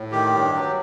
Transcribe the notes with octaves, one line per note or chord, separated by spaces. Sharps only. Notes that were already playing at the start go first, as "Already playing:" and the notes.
Already playing: A2
D#3 G4
G2
F#3